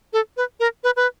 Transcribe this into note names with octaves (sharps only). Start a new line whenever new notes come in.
A4
B4
A#4
B4
B4